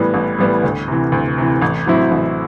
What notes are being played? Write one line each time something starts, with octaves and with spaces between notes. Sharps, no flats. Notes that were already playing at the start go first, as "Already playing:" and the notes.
Already playing: A2 E3 G3 B3
A1
A2 E3 G3 B3
D2
C3 E3
D2
C3 E3
A1
A2 F#3 C4 E4
A1